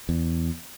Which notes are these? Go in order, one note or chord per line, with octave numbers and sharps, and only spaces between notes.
E2